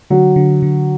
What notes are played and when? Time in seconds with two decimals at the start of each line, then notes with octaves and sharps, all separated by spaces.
0.10 D3 F#3
0.36 D3
0.62 D3